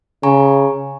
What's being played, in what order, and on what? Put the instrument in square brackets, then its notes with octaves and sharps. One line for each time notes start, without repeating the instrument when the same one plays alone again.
[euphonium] C#3 [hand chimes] G#5 A#5 C#6